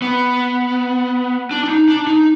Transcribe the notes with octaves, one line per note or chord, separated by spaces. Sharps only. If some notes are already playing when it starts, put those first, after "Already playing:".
B3
D4
D4
D#4
D4
D#4